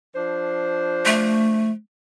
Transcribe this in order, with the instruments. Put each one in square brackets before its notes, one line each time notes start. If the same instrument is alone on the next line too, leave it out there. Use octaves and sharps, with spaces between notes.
[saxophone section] F3 D4 C5
[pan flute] A3